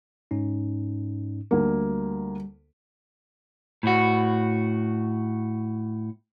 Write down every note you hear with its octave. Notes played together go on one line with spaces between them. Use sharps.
G#2 C#4 D#4
D2 G3 A#3
A2 F#4